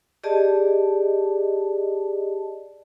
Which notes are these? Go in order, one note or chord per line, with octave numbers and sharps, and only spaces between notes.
G4 G#4 D5 D#5 A5